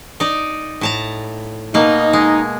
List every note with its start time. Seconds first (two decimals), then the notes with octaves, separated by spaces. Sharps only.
0.20 D#4 D5
0.81 A2 A5 A#5
1.74 B2 A#3 D#4
2.13 G#3